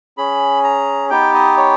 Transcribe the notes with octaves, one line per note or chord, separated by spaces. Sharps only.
C#4 G#4 B5
A#5
B3 D#4 G4 G5
D#5
C#5